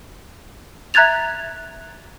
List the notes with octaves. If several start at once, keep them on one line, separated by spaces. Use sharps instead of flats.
E5 A#5 F#6 G#6 A6 F7